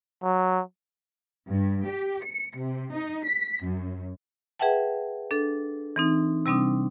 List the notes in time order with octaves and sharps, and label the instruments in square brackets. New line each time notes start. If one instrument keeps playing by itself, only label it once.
[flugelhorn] F#3
[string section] G2
G4
C#7
C3
D#4
B6
F#2
[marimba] G#4 B4 E5 F#5 G5 A5
D4 A4
E3 C4 D#4
C3 G3 C4 D4 D#6